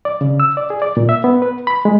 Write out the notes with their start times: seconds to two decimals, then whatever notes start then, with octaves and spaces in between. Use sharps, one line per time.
0.05 D5
0.21 C#3
0.40 E6
0.57 D5
0.70 G#4
0.82 D5
0.97 A#2
1.09 E5
1.24 B3
1.42 B4
1.67 B5
1.85 G#3